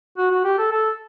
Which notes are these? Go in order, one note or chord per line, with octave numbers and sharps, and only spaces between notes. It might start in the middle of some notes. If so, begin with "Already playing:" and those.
F#4
F#4
G4
A4
A4